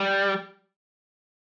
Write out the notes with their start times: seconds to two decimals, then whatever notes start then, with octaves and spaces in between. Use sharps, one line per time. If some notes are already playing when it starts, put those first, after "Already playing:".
Already playing: G3